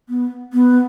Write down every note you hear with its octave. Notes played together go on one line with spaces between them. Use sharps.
B3
B3